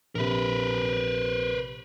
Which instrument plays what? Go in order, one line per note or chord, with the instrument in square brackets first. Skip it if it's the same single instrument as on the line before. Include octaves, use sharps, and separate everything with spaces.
[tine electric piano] A#1 C3 [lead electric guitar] A#4 B4